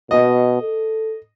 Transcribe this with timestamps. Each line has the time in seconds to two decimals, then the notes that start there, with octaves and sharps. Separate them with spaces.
0.11 B2 D#5
0.62 A4